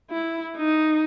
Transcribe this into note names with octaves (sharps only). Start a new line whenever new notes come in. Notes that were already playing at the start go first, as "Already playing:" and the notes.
E4
D#4